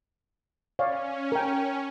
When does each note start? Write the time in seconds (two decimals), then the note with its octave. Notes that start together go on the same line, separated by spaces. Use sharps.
0.79 C#4 C#5 D5 F5
1.32 A#4 G5